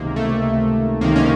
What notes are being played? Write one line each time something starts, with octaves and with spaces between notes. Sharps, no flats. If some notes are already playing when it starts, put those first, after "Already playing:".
Already playing: C#2 C3 D#3 A#3
A3
C#2 C3 D#3 A#3
C#4